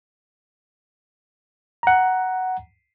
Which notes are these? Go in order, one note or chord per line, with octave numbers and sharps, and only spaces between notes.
F#5 A#5